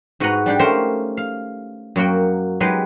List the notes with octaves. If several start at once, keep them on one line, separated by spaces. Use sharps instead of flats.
G#2 F#4 B4 D#5 F#5 A#5
G3 D4 G4
A3 C#4 G4 A#4 C5 F5
F5
F#2 F#3 A#3 F#4 G5
F#3 G#3 D#4 G4 G#4 B4